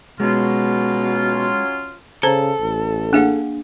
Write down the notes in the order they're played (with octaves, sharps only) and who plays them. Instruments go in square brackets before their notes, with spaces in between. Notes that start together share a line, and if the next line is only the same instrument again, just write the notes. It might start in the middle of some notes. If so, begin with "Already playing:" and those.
[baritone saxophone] B2 [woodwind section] F#3 C#4 F4 [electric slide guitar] G#3
[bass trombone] C#3 [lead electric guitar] A4 [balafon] C5 A#5
[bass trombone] A1
[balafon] A#3 G#4 F#5 [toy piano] D4 F5